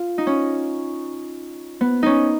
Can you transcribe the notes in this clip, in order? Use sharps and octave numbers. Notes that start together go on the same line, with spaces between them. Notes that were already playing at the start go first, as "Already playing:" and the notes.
Already playing: F4
D#4
C#4
B3
C#4 D#4